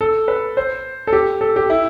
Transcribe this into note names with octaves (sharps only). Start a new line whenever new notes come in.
A4
B4
C5
A4
G4
A4
G4
E4